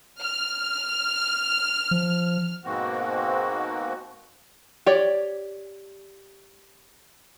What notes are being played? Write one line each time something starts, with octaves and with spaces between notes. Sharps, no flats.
F6
F3
G#2 B2 A#3 C4 F#4
G4 C#5 D5